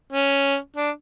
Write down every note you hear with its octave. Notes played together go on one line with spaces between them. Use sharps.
C#4
D4